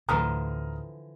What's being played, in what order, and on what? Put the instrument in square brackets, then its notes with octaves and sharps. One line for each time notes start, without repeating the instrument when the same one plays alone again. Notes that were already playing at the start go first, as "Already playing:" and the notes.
[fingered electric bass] D2 A2 [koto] D3 E3 F3 [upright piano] A#5 D#6 F6